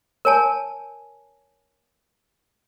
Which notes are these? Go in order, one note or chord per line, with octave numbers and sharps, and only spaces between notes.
A#4 C#5 G#5 A5